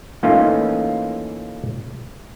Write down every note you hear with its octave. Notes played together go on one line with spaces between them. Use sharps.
E3 A3 A#3 C#4 D#4 F4